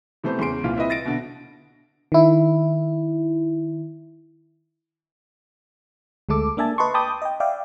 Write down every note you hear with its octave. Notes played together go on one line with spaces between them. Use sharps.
C3 E3 A3 B3 C5
E2 C#3 C6 D7
C2 A#2 E3 F4
C4 E4 B4 D#5 E5
A6 A#6 D7
B2 D3
D#3 E4
D2 G#3 A3 A4 D6
A#3 D4 E5 G#5 A5
B4 D#5 A5 C6 C#6
G5 A5 B5 D6 D#6 G6
D#5 G5
D5 E5 F5 G5